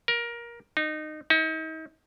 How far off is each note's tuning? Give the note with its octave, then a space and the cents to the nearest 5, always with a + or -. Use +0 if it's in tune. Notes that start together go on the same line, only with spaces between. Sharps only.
A#4 +20
D#4 -20
D#4 +40